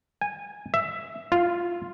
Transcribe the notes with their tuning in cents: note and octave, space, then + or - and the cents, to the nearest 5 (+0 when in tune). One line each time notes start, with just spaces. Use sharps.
G#5 -15
E5 +10
F4 -5